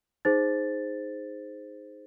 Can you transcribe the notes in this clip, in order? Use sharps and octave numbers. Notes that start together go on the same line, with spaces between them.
D#4 G#4 C5 A6